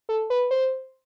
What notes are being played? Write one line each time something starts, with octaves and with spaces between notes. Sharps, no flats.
A4
B4
C5